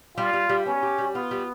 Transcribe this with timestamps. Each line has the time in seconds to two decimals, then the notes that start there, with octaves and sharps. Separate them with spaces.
0.17 G3 F4
0.33 G3
0.49 G3
0.66 B3 C#4
0.83 G4
0.98 G3
1.14 B3 F4
1.31 G3